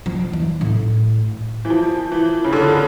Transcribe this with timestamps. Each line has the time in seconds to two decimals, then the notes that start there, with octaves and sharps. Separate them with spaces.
0.06 F3
0.33 E3
0.61 A2
1.65 E3
1.70 F3
2.12 E3
2.44 C#3
2.53 D3